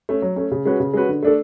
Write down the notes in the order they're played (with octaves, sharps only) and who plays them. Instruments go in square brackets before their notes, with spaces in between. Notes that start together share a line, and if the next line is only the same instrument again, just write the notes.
[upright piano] A3 C#4
F#3
A3 C#4
C#3
G#3 C#4 F#4 B4
C#3
G#3 C#4 F#4 B4
D3
A3 D4 A4